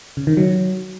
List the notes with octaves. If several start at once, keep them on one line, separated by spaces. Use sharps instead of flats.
C#3
D#3
F#3